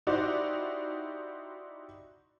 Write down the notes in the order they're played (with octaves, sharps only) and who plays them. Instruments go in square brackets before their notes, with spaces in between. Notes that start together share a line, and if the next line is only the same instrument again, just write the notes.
[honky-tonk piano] D#4 E4 F#4 G4 C5 D5